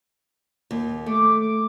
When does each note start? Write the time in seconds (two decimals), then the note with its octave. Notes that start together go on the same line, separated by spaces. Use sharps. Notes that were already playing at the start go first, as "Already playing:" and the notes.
0.71 D#2
1.06 A3 D6